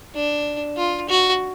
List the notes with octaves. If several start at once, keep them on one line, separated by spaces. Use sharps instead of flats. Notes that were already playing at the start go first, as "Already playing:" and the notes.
D4
F4
F#4